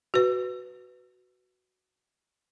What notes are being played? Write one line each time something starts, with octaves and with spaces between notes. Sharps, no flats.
F#4 B4